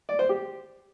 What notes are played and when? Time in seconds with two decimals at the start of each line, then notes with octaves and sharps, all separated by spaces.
0.09 D5
0.19 C5
0.29 G4